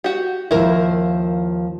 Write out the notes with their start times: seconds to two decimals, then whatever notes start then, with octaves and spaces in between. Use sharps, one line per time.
0.04 F#4 G4
0.51 D#2 F3 E4 A#4